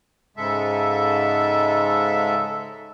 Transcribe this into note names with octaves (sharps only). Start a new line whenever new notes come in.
G#2 C#3 G#3 A4 E5